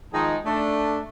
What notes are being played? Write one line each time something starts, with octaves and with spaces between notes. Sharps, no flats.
D#3 F3 G#3 D#4 G#4 A5
A3 D4